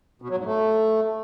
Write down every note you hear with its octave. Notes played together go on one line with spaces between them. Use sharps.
B2
F#3
G#2
A3